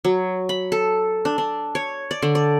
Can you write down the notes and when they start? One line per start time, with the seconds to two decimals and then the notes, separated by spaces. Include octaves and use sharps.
0.04 F#3
0.49 B5
0.72 A4
1.25 D4
1.38 D4
1.75 C#5
2.11 D5
2.22 D3
2.35 D5